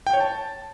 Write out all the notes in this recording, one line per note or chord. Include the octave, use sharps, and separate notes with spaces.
G5
C#5
A5